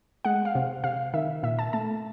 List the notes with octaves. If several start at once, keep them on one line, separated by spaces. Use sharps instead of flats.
G#3 F#5
F5
C3
C3 F5
D#3 E5
A#2 E5
A5
A3 A5